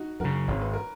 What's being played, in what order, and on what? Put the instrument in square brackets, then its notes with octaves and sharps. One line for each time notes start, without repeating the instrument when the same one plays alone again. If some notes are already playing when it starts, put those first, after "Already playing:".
Already playing: [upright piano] D#4 F#4
[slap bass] F#2 C#3 [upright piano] F#4 A#4
[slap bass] G#1 [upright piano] C#5
[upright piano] B4
A#4